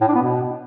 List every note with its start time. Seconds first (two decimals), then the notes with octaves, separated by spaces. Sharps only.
0.01 A2
0.08 D4
0.15 B3
0.22 B2